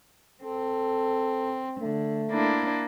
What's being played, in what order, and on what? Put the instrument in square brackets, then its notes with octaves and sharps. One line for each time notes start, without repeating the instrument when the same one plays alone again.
[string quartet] C4 [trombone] A4
[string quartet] D3 [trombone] A3
[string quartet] A#3 D4 E4